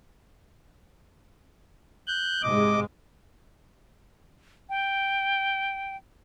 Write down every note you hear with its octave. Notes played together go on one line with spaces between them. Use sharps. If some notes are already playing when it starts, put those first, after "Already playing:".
F#6 G6
G#2 C3 G#3 D#5 D6
G5